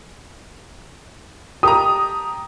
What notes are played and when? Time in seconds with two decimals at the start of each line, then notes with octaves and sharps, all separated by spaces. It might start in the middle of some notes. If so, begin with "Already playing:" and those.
1.63 G4 A5 A#5 D#6